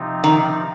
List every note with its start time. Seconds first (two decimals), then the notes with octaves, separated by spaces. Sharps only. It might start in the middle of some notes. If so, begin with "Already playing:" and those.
Already playing: C3 F3 C4 D#4
0.24 D#3